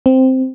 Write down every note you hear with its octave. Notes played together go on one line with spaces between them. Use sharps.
C4